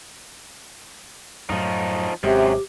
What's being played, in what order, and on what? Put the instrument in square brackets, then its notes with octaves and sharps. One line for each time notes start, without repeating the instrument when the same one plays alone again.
[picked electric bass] F#2 A2 F#3 [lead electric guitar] F3 D#4
[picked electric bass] G#1 G#3 [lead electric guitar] F#2 [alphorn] C3 [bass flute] G4